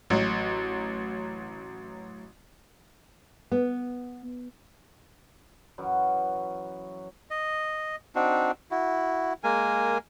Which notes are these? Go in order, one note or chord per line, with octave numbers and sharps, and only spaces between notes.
A1 F#3
B3
F#2 E3 F#3 F#4
D#5
C4 D4 D#4 F#4
E4 F#4
G#3 A#3 A#4 G#5